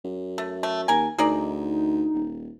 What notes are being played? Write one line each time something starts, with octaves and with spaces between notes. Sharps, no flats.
F#2
A3
A3
D#2 A#4 G#5
D2 D#4 G#4 A#4 D5
D#1